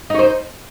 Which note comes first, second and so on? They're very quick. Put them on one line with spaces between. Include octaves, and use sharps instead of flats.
D#4 C#5 C5